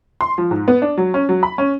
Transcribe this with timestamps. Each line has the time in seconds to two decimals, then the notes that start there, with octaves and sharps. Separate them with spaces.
0.21 C6
0.38 F3
0.51 G#2
0.68 B3
0.82 D4
0.97 F#3
1.14 C#4
1.29 F#3
1.43 B5
1.58 C#4